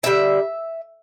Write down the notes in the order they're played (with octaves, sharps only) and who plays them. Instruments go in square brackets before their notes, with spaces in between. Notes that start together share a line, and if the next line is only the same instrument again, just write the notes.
[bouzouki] D3 G3 C4 E5